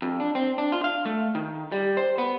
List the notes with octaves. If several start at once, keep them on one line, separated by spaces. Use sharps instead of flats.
F2
D4
C4
D4
F4
F5
A3
D#3
G3
C5
B3